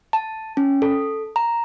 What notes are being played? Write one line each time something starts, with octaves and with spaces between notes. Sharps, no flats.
A5
C#4
A4
A#5